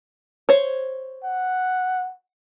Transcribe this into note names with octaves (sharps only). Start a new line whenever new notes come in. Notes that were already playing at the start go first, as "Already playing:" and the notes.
C5 C#5
F#5